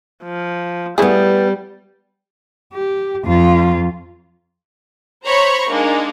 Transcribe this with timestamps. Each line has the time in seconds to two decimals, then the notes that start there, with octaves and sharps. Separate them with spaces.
0.23 F3
0.98 G3 A3 B3 E4 G#4 D5
2.74 G4
3.25 F2 F4
5.24 C5 C#5 A#5 B5 C#6
5.70 G#3 A#3 D4 D#4